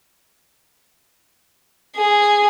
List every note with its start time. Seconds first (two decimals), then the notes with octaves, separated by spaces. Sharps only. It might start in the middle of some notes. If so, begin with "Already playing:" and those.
1.97 G#4